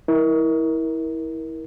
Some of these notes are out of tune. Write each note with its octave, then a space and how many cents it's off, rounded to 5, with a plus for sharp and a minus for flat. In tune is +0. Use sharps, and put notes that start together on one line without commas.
E4 -25 A#4 +15